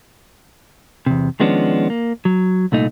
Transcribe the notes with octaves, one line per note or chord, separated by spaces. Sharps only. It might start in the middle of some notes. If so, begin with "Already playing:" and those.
E2 C3
D#3 F3 G#3 B3 C#4 D4
A#3
F#3
C2 A#2 A3 D#4